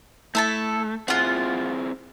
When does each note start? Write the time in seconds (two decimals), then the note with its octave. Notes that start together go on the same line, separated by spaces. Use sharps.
0.35 A3 E4 A4 A5
1.08 C4 E4 F4 G#4 F#5